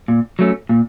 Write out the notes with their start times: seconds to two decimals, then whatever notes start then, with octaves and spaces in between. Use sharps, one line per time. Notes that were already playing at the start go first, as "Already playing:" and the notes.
0.08 A#2
0.39 F#3 A3 C#4
0.69 A#2